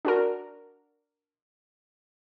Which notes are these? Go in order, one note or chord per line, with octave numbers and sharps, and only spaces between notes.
D4 F#4 A#4